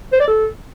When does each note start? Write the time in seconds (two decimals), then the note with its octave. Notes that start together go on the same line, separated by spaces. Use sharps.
0.13 C5
0.20 D5
0.28 A4